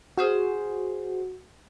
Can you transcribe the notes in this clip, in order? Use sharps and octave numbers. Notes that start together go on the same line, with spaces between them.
F#4 G#4 C5 F6